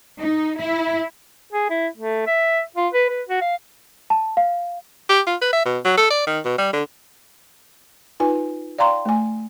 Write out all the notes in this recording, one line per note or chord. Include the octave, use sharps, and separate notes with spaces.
D#4
E4
G#4
E4
A3
E5
F4
B4
B4
F#4
F5
A5
F5
G4
F4
B4
E5
B2
F#3
A4
D5
D#3
B2
G3
D3
D#4 F4 B4 G#5
D5 F5 G5 A#5 C6 C#6
A3 G#5